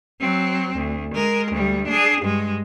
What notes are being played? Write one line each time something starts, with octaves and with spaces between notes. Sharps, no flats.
F#3 C4
D2
G#3 A#4
D2 G3
D4 G#4
G2 G#3